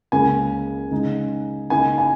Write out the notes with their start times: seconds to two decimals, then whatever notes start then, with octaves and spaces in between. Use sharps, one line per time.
0.12 C#2 C#3 A#3 C#4 G#5
0.91 C#3 G#3 D#4
1.70 C#3 A#3 D#4 G#5
1.98 G#5